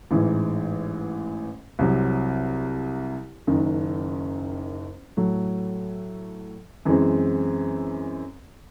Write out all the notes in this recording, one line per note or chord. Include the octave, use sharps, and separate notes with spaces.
A1 G#2 E3
C2 C3 F#3
F#1 F#2 D#3
A2 F#3 A3
F#2 E3 G#3 C4